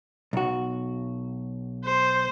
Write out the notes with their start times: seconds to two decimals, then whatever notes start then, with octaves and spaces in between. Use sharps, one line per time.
0.33 B1 F#4
1.85 C5